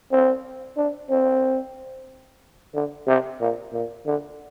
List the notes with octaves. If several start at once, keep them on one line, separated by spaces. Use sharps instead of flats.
C4
D4
C4
D3
C3
A#2
A#2
D3